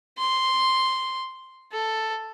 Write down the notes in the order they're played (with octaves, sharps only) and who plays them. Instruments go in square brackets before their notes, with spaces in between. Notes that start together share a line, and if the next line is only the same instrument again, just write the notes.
[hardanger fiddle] C6
A4